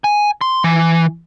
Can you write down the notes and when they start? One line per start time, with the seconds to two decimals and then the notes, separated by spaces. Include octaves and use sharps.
0.04 G#5
0.41 C6
0.64 E3